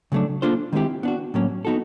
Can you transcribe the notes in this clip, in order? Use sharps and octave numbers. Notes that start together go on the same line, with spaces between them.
C#3 F#3 A3 D4
A#3 D4 F4 A4 C5
D#3 G#3 C4 E4 G4
B3 D4 F#4
A2 F#3 A#3 C#4
B3 D#4 F#4 A4